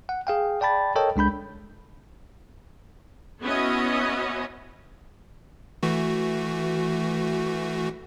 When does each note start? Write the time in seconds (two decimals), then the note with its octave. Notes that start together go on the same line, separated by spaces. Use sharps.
0.09 F#5
0.27 G#4 F5 G5
0.61 D5 G5 A5 B5 A6
0.96 A4 A#4 C#5 D#5 G5 A5
1.16 C#2 G#3 D4 B5 G6
3.43 B3 C#4 E4 F#4 C#5 D#5
5.83 E3 A3 F#4